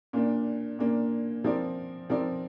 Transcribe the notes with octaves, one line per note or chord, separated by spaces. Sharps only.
A#2 A#3 D4
A#2 A#3 D4
F3 C4 A#4 D5
F3 C4 A#4 D5